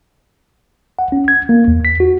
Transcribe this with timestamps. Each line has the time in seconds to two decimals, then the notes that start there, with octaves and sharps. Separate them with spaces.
0.99 F#5
1.12 C#4
1.28 G#6
1.49 A#3
1.68 E2
1.85 B6
2.00 F#4